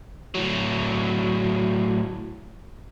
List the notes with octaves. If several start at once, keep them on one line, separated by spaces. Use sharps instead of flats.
A2 F#3